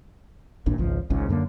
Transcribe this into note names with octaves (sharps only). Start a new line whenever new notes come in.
G#1 D#2 A#2 D4
G#1 C#2 F3
G#1 C#2 G#2 C#3
F#2 D3 A#3